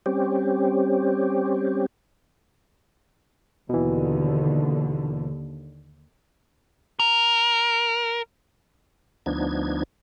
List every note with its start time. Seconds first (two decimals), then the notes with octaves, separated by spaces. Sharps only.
0.06 G3 C4 C#4 G4
3.69 D#2 B2 D3 E3
7.00 A#4
9.26 D2 F3 B3 D4 D#4 G#6